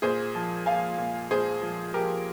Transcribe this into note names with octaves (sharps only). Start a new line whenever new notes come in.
A#2 G#4 C5
F3
F3 F5 G#5
A#2
A#2 G#4 C5
F3
F3 G4 A#4